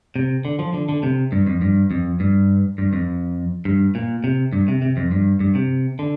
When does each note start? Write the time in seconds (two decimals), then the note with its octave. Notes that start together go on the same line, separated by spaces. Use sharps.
0.16 C3
0.45 D3
0.59 F3
0.74 D3
0.89 D3
1.03 C3
1.32 G2
1.47 F2
1.61 G2
1.91 F2
2.20 G2
2.78 G2
2.93 F2
3.65 G2
3.95 A#2
4.24 C3
4.53 G2
4.68 C3
4.82 C3
4.97 F2
5.11 G2
5.40 G2
5.55 C3
5.99 D3